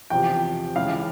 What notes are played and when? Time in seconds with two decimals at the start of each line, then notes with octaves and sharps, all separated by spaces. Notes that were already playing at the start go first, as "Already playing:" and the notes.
0.10 E2 C3 F3 G5
0.76 C#2 C#3 E3 F5